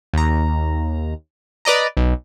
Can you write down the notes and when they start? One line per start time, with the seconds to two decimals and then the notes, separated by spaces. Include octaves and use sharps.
0.14 D#2 A#5
1.65 B4 D5 D#5 A#5
1.97 B1